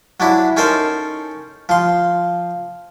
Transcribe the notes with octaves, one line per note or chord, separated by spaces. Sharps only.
F#3 D4 E4
C#4 D#4 A4 A#4 C5
F3 C6